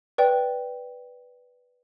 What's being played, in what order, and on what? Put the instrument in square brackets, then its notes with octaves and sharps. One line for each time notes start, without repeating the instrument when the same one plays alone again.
[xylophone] B4 D5 G5